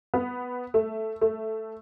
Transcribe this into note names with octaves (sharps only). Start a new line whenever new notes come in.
B3
A3
A3